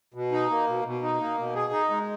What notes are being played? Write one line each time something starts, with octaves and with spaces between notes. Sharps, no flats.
B2
D#4
A#3
B2
B2
D#4
A#3
B2
G#4
D#4
G#3